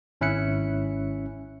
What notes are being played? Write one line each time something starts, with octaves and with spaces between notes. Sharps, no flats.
G#1 C#4 E4 E5 F#6 C#7